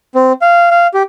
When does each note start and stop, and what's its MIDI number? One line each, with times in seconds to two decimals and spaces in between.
0.15 0.33 60
0.42 0.69 77
0.71 0.87 77
0.94 1.03 67